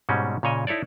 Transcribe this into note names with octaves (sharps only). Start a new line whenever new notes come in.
G#2 B2 G3 G#3 C4 C#4
A#2 C#3 C#5 D#5 G#5
D#4 E4 A4 C#5 D5